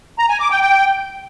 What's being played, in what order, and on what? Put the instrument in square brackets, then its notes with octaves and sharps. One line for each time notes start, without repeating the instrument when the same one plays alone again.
[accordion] A#5
G#5
D6
G5
G5